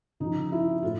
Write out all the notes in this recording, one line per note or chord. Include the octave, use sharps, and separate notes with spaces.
C#3 F3 D#4
E4
A2 F4